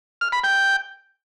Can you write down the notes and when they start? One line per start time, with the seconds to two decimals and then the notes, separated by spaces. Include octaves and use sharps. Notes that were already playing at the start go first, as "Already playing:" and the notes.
0.21 F6
0.32 B5
0.44 G5